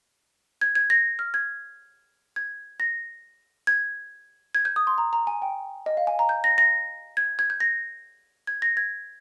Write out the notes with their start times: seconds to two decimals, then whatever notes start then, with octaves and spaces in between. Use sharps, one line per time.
0.61 G#6
0.75 G#6
0.90 A#6
1.19 F6
1.34 G#6
2.36 G#6
2.80 A#6
3.67 G#6
4.55 G#6
4.65 G6
4.76 D#6
4.87 C6
4.98 A#5
5.13 A#5
5.27 G#5
5.42 G5
5.86 D#5
5.97 F5
6.07 G#5
6.19 A#5
6.29 G6
6.44 A#6
6.58 A#6
7.17 G#6
7.39 G#6
7.50 G6
7.60 A#6
8.47 G#6
8.62 A#6
8.77 G#6